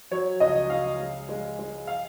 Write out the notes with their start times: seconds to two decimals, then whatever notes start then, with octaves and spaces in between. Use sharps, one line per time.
0.11 F#3 C#5
0.40 C#2 D#5
0.70 C#2 F5
0.99 G#3
1.29 G#3
1.59 G#3
1.87 F5